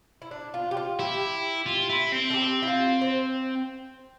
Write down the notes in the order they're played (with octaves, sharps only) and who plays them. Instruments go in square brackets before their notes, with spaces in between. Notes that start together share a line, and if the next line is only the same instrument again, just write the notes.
[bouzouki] E4
D4
F4
G4
F4
[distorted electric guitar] E4 [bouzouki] G4
[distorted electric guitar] F4
E4
C4
[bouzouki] A4
G4
E4
F4
C5